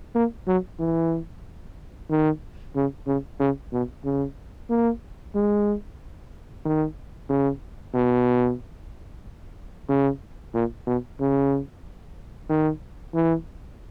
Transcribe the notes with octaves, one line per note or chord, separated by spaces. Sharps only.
A#3
F#3
E3
D#3
C#3
C#3
C#3
B2
C#3
A#3
G#3
D#3
C#3
B2
C#3
A#2
B2
C#3
D#3
E3